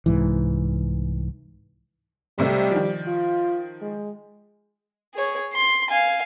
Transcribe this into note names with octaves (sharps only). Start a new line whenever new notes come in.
C2 G#2 E3
B1 C3 G3 A3
D#3 F3
F4
G#3
G#4 C#5
C6
F5 G#5